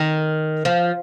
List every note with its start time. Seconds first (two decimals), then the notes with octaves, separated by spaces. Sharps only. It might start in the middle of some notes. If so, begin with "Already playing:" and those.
Already playing: D#3
0.65 F3